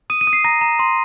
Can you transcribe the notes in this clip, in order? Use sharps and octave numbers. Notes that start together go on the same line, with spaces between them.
D#6 D#7
D#7
D#6
C7
A#5 A#6
A#5
C6